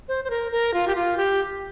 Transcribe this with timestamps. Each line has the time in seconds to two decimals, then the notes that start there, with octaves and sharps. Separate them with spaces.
0.08 C5
0.24 C5
0.30 A#4
0.52 A#4
0.74 F4
0.88 G4
0.95 F4
1.17 G4